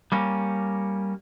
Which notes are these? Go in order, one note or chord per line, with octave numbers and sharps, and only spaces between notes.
G3 A#3 C#4